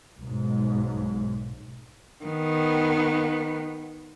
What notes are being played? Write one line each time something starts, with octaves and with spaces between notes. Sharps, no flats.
B1 G#2
D#3 B3